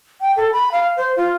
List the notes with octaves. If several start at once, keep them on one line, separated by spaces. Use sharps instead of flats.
G5
A4
B5
F5
C5
F4